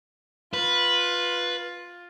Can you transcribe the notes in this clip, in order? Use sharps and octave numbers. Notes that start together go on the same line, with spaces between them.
F4 B4